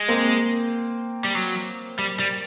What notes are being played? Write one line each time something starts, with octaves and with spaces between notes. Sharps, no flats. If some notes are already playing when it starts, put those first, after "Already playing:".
Already playing: G#3
A#3 C4
G3
F#3
G3
G3